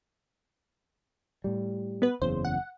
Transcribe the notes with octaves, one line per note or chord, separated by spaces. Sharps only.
A2 G3
B3 B4
F#1 E2 C#3 C5
F#5